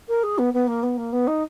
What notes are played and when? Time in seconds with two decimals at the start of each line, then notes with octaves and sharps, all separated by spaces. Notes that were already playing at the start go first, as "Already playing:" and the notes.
0.08 A#4
0.23 G#4
0.38 B3
0.53 B3
0.67 A#3
0.83 B3
0.97 A#3
1.12 B3
1.27 D#4